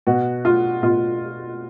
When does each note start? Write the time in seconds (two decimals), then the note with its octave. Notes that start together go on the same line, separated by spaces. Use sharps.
0.07 B2 F#4
0.45 F4
0.82 B2 F4